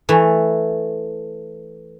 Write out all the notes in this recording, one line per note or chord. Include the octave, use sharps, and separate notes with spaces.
E3 A3